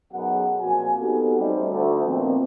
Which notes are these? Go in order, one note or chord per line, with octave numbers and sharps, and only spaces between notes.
B1 F#2 B2 G#4 F#5
A#2 F3 C4 F#4 G#5
B3 C4 D#4 F#4 G4 A4
G3 A3 C#4 D#4 C5
D2
A#2 D#3 F3 B3 C4